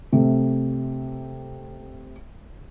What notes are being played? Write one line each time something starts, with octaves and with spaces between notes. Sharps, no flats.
C3 A3